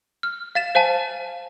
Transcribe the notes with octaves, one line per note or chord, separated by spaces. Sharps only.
F6
F5 A6 E7
C5 F5 G#5 A5